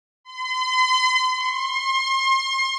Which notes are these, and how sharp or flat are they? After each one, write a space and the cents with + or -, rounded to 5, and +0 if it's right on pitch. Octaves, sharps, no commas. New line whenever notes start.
C6 -40
C6 +35